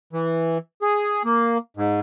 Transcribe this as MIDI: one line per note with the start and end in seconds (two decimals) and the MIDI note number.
0.13 0.58 52
0.82 1.23 68
1.25 1.58 58
1.77 2.00 44